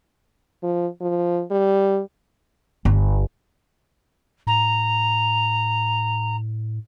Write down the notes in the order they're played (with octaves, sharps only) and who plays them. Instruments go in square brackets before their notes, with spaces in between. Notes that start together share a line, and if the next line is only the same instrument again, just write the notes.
[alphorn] F3
F3
G3
[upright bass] G1
[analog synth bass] A2 [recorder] A#5